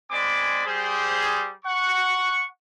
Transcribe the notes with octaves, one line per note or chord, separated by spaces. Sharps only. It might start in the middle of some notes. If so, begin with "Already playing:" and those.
G#3 C4 D5 G#5 B5 D6
G3 G#4 C5
F#5 C#6